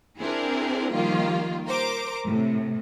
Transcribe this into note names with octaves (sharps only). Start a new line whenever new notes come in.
C4 D4 E4 G#4 A#4
D#3 F3 G3 A#3 F4
A#4 C5 A#5 D6
A2 C3